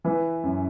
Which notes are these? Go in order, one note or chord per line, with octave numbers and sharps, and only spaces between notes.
E3 B4
F#2